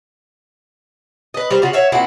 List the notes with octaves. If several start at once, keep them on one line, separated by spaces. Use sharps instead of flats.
B4 D#5
G3 A#4 C5
C#3 F4 F#4
C#5 E5 F5
A#2 C4 E4 F#4